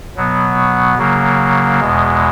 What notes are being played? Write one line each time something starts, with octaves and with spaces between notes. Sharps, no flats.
B2 F#3 B3
C#3 F#3 A#3
E2 B2 G#3